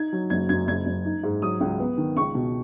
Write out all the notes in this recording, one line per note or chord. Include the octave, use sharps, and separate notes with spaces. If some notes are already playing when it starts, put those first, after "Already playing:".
Already playing: D#4 G#6
F#3
F#1 G#6
F#2 G#6
F#1 G#6
F#1
D#4
G#2
F#3 D#6
C#2
B3
D#3
C#2 C#6
B2